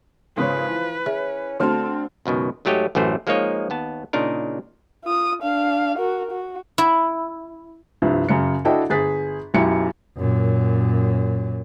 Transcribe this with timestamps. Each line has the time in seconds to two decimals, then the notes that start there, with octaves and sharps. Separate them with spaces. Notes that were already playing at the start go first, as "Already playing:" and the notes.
0.37 G#1 C#3 F3 B4 C#5
0.68 E3
1.06 C#4 G#4 C#5 E5
1.60 D3 A3 C4 F#4 A4 C6 F6
2.26 C#2 F#2 B2 D#3
2.65 G#2 F#3 A3 G4 C#5 D#5
2.95 A1 F#2 E3 A3 C5
3.27 F3 G#3 A#3 D#4 C#5 D#5
3.70 D#2 B3 A5
4.13 A#2 C#3 D4 D#4 A#4
5.04 F4 D#6
5.42 D4 F5
5.98 F#4 A#4
6.31 F#4
6.78 E4
8.02 C2 G2 F3
8.29 F#2 C#3 C#7
8.65 D4 E4 F#4 A4 D#5 G5
8.90 G1 G#4 A6 B6
9.54 B1 F#2 E4 G4 C#7
10.17 F#2 A#2